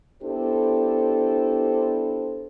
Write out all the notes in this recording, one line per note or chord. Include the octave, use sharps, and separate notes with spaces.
B3 D4 E4 G4 A4 C5